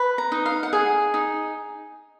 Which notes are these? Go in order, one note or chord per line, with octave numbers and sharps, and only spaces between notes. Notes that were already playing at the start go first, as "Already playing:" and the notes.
Already playing: B4
A#5
D#4
F5
F#5
G#4 G#5
D#4